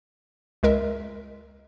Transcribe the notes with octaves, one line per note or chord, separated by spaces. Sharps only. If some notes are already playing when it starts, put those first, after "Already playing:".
C#2 G#3 A#4 E5